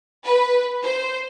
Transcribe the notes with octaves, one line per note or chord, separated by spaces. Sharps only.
B4
C5